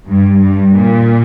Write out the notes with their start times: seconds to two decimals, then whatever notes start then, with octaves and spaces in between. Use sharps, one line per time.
0.08 G2
0.42 G2
0.74 A#2